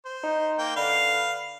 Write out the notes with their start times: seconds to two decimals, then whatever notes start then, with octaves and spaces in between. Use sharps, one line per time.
0.06 C5
0.23 D#4
0.59 A#3 G5
0.76 D3 B4 F5